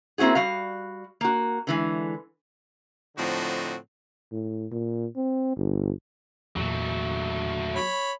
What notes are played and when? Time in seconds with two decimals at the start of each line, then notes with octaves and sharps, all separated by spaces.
0.18 A#3 C4 E4 F#4 G#4
0.35 G3 F#4 F5
1.21 A#3 F#4
1.67 D3 E3 G#3
3.17 A2 D3 F3 C4 D#4 F#4
4.32 A2
4.72 A#2
5.16 C4
5.57 G1
6.56 E2 A#2 F#3 A3
7.75 C#5 B5